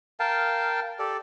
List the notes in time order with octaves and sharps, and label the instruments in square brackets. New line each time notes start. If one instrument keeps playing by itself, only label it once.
[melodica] A#4 F5 G5 A5
G4 A4 D5